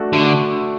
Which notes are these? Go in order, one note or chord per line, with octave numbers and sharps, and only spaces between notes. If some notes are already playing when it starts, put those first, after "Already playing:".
Already playing: A3 D4 F#4 A4
D3 A3